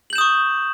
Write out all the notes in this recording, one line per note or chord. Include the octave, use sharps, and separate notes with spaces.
C#6 D#6 G6 E7 F#7